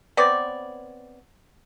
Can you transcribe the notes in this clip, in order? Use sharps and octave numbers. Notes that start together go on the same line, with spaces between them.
B3 C4 C#5 D5